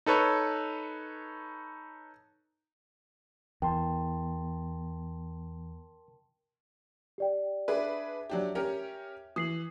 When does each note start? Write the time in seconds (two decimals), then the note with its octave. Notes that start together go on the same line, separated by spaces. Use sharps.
0.06 D#4 A4 B4 C#5
3.62 E2 A#4 G5 A5 C6
7.18 G4 D5 G5
7.68 D4 G#4 B4 E5
8.30 F#3 D4 G4
8.55 C#4 G4 A#4
9.36 E3 D#6 C7 F#7